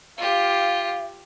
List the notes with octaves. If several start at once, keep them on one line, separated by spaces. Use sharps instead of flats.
F4 G4 F5